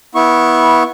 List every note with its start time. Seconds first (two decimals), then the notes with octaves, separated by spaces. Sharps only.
0.15 B3 E4 C#6